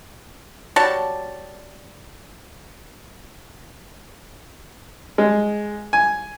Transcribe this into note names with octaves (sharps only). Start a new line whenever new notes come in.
G3 F#4 C#5 A5
G#3
G#5